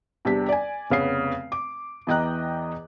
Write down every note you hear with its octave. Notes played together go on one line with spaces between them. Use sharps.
E2 C3 G3 D4 B6
D5 G#5
F1 C#3 B3 C7
D6
E2 E3 D#5 G5 A#5 F#6